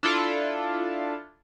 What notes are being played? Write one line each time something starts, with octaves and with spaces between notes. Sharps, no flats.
D4 E4 F4 A4